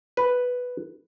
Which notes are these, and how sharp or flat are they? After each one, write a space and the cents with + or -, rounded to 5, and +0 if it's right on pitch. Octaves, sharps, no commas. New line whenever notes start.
B4 +0